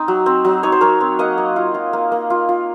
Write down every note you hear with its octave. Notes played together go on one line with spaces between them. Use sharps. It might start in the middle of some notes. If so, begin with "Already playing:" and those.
Already playing: C4 D#4
F#3
C4
F#3
D#4 C#5
C5
F#3 A#4 C#5
C4
A#3 D#5 F#5
A#3
F4
F4
A#3
A#3
F4
F4